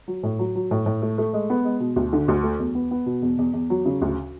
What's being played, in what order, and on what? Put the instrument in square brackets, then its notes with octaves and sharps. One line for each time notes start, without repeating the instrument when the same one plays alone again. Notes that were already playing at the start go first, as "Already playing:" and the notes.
[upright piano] F#3
A2
F#3
F#3
A2
A2
A3
A3
G#3
B3
G#3
B2
D2
D3
D2
A3
E2
B3
B3
B2
E2
E2
E2
F#3
C#3
D2